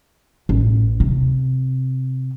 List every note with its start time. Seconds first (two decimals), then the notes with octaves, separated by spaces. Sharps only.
0.49 A1
1.00 C3